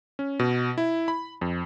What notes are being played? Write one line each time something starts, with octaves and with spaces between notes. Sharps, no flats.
C#4
B2
E4
B5
F2